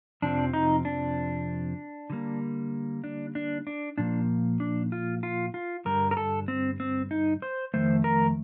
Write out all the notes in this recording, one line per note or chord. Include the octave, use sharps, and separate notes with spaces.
F2 C3 F3 C4 D4
D#4
D4
D3 G3 A#3
D4
D4
D4
A#2 F3 A#3 D4
D4
F4
F4
F4
G2 D3 G3 A#4
A#4
A4
C4
C4
D#4
C5
F2 D#3 A3 C5
A#4